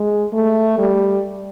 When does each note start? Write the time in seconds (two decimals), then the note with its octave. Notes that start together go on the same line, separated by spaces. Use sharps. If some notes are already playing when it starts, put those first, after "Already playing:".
Already playing: G#3
0.33 A3
0.78 G3